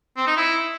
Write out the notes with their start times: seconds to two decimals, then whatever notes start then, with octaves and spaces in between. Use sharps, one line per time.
0.17 C4
0.27 D#4
0.37 E4